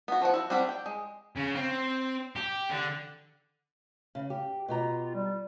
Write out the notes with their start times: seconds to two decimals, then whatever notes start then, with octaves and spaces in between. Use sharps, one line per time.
0.08 B3 F#4
0.22 F3 C5 F#5
0.34 E4 F#4
0.50 G3 C4 D4 F#5 B5
0.69 G5
0.86 G#3
1.36 C#3
1.55 C4
2.36 G4
2.70 D3
4.15 C#3
4.30 G4
4.68 B2 F4 G4 A#5
5.15 G3